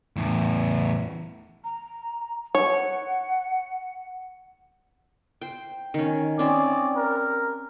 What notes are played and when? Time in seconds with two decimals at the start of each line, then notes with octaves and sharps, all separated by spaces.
0.16 E2 A2
1.64 A#5
2.55 C#5 F#5
5.41 C5 G5
5.94 D#3 C#4
6.39 C4 C#4 D5
6.97 A#4